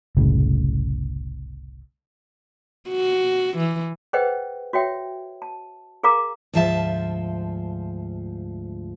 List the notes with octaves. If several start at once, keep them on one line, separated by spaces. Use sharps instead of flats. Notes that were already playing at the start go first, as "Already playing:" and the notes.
F#1 C2 A2 C#3
F#4
E3
G#4 B4 C5 D#5 F#5 G5
F#4 C#5 E5 G5
A5
G#4 A#4 F5 A#5 D6
D2 G#2 F3 F4 E5 A5